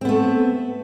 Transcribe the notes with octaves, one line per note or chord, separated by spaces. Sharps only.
A3 B3 C4